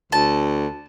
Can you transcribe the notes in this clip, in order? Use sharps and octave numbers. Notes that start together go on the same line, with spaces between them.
D2 A5